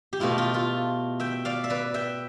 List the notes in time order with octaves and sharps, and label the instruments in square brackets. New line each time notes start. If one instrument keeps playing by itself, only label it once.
[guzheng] G4
B2 A3 E4 F4
F4
F4 A4
E5 G5
D5 F5
E5
B4 D5
E5 G5